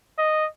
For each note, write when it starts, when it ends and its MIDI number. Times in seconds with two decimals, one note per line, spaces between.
0.18 0.46 75